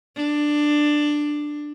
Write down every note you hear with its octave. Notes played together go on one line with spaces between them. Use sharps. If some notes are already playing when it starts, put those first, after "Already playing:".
D4